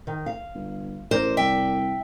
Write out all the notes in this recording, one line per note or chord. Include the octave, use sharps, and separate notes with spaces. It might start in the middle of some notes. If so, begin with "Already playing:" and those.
D#3
F5
G1
A1 A#4 C5 D5
C2 E5 G5